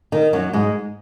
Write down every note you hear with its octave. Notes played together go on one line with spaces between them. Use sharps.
D#3
F#2 F#3
G#2 G#3